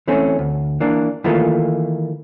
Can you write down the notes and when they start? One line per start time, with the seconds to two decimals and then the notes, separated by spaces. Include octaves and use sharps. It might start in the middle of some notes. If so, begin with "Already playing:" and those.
0.08 E3 A3 C4 C#4
0.39 D2
0.80 E3 A#3 D4
1.24 D#3 E3 A3 A#3 F4